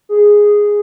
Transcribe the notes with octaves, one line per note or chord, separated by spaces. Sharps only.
G#4